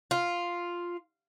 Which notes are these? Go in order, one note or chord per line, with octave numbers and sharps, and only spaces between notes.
F4